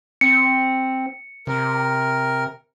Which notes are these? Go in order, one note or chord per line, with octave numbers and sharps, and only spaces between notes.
C4 C#7
C3 A#4